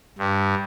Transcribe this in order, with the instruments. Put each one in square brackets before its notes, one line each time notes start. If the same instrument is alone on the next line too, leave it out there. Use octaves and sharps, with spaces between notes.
[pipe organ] G2